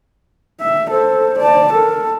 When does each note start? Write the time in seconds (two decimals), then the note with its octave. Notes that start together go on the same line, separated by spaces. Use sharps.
0.61 E5
0.91 A4 C5
1.39 D5 A5
1.73 A4 A#4